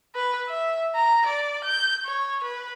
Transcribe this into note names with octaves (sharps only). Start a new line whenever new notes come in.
B4
E5
A#5
D5
G6
C#5
B4